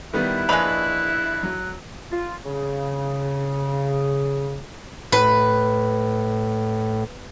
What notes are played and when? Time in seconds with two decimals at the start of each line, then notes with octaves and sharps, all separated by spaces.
0.14 D#3 G3 B3 E4 F#6
0.49 A#1 G#3 B4 D#5 F7
1.43 F#3
2.11 F4
2.45 C#3
5.12 A2 B4